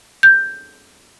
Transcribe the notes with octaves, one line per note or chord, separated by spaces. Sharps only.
G6